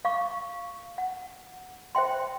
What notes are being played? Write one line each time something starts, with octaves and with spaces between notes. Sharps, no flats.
F5 C#6 D6
F#5
C5 E5 G5 C6